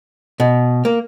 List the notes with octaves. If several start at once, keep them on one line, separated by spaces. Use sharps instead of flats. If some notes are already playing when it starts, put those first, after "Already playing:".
B2
A#3